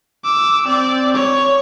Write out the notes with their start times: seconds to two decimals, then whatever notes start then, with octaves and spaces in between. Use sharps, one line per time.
0.24 D6 E6
0.67 C4 D5
1.15 C#5